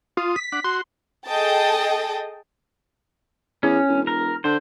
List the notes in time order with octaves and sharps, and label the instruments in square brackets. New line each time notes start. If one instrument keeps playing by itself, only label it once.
[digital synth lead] F4 [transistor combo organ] D#6
[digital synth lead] B6
[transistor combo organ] D4 F#5
[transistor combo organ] F#4 [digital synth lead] C6
[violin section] G#4 A4 D#5 G5 A5
[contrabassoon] E2 [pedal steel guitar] C#4
[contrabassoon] E1
[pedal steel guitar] A#4
[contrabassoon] D3 [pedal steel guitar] C5